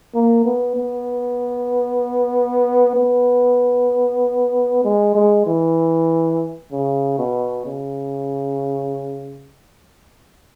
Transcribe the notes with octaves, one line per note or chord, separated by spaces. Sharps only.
A#3
B3
B3
B3
G#3
G#3
E3
C#3
B2
C#3